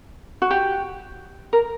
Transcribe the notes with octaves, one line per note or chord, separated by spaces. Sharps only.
F#4
G4
A#4